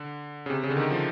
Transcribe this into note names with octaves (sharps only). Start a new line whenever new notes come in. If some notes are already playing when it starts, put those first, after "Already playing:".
Already playing: D3
C#3
C3
C#3
D3
D#3
F3